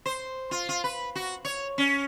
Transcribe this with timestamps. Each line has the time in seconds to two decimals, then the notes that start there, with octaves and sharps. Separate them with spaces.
0.06 C5
0.51 F4
0.69 F4
0.84 B4
1.15 F#4
1.45 C#5
1.78 C#4